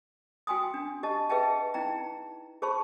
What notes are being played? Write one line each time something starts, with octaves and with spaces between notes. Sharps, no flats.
F#4 G5 G#5 C6 D#6
D4
G4 D#5 A5
G#4 B4 D#5 E5 G5 A5
D#4 E4 G5 A#5
G#4 C5 A5 B5 C#6